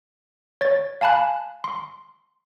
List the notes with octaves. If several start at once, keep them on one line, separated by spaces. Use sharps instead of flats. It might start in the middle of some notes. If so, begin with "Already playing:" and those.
C#5 A6
F5 G#5 A5 B5 F#6
C6